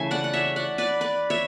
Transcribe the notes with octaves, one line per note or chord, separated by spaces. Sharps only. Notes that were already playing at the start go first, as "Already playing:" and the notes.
Already playing: C#3 E3 A3 E5 G#5
D5 F#5
F#5
C#5 E5
D5 F#5
B4 D5
B4 D5
C#5 E5